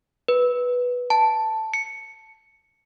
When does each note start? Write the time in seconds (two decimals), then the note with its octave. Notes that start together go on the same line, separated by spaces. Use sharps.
0.28 B4
1.10 A5
1.74 C#7